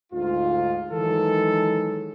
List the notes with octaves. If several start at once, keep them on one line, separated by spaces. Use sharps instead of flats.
D2 G#2 F4
D#3 E3 F#3 G#3 A4